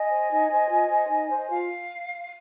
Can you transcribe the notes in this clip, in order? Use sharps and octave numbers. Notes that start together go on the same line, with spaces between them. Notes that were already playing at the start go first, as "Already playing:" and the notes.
Already playing: D#5 G#5
C5
D#4
C5
F4
C5
D#4
C5
D#5
F4 F5